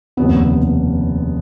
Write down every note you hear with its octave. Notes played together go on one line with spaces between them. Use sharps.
F1 D#2 C#3 B3